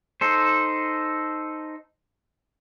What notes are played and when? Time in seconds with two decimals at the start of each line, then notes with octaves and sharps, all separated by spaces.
0.21 D#4 A4 C5